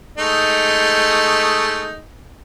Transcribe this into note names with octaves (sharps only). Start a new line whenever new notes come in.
G#3 A3 D#4